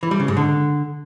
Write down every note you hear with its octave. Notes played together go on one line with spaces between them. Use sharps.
E3
G3
C#3
G#2
D3